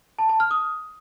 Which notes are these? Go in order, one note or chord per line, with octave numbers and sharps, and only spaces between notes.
A5
A5
F6
D#6